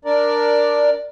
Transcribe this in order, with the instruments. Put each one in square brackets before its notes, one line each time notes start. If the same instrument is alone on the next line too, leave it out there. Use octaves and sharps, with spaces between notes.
[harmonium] D4 A#4 D5